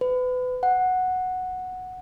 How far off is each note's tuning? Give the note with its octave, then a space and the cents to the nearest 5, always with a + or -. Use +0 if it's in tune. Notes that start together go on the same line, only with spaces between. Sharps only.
B4 +30
F#5 -5